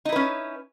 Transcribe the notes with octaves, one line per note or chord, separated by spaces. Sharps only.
C#4 D#4 E4 B4